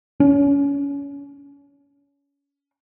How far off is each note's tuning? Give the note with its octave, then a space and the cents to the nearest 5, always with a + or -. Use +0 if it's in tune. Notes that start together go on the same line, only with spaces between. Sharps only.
C#4 +30